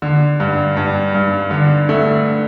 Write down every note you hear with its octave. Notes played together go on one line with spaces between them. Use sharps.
D3
G2
G2
G2
D3
A3